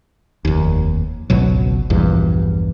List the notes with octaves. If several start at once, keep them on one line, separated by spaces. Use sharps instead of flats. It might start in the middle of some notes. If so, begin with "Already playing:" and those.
F1 D#2
G#1 C#2 B2 F#3
A#1 E2 G2